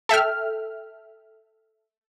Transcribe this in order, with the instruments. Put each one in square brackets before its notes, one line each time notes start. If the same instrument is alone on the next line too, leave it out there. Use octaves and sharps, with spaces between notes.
[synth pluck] A4 E5 G5 F6